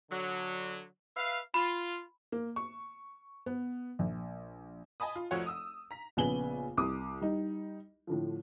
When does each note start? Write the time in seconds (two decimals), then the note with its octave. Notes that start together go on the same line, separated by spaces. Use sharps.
0.10 D3 F#3
1.16 B4 E5 F5
1.54 F4 B5
2.32 A#3
2.56 C#6
3.46 B3
3.99 A#1
5.00 D#5 G#5 A5 B5 D#6
5.16 F4
5.31 F1 F3 F#4 C#5 F#5
5.46 D#6 E6
5.91 A#5 B6
6.17 A#1 C#3 B3 G#5 F#7 G7
6.77 C2 D6 D#6
7.21 G3 D#4
8.07 A2 D3 F3